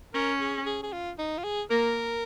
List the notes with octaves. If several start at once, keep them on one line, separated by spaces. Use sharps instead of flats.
C#4 A#4
G#4
G#4
G#4
F4
D#4
F4
G#4
A#3 A#4